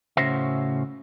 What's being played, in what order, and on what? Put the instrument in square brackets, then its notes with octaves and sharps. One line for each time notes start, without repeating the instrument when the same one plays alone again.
[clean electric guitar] A2 C#3 C#4 F#4 C5 E5